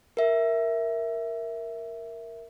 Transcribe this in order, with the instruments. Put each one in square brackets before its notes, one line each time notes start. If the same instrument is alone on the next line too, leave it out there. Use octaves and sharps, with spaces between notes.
[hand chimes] A#4 E5